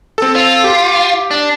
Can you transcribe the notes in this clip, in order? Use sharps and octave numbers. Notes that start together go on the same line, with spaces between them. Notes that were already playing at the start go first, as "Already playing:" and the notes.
C4 A4
F4
G4
D4